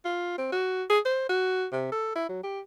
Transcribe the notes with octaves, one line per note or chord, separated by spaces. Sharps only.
F4
C4
F#4
G#4
C5
F#4
C3
A4
E4
F#3
G4